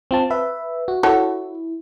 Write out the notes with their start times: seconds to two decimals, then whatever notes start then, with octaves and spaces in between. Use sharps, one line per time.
0.11 C4 F4 A5
0.30 B4 E5
0.88 F#4
1.03 E4 F#4 A4 C#5